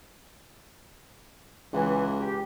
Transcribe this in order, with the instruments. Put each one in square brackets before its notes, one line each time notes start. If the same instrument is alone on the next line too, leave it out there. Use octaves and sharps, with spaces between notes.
[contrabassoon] C#2 [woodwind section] E3
[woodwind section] G4